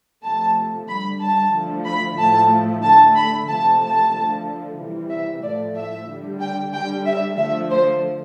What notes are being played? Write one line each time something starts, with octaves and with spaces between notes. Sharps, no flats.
C3 F3 A3 A5
D3 G3 B5
A5
D3 F3 A3
B5
A2 F3 A3 A5
D3 A3 A5
B5
C3 F3 A3 A5
A5
D3 F3 A3
C3 E3 G3
E5
A2 F3 A3 D5
E5
D3 G3
G5
D3 G3 G5
E5
D3 F3 A3 E5
C5